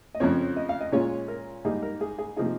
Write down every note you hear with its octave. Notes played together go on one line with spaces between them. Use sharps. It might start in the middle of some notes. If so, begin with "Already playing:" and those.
D#5
F2 C#3 F3 C4 C#5
D#5
F5
D#5
A#2 G#3 C#4 F4 C#5
A#4
G#2 G3 A#3 D#4 G#4
A#4
G#4
G#4
C3 F3 A#3 D#4 G#4